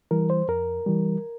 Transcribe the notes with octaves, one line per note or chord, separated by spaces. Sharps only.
E3 G3 A#4
C5
F2 A#4
E3 G3